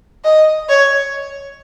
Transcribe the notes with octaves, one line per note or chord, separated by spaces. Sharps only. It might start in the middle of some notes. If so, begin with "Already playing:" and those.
D#5
C#5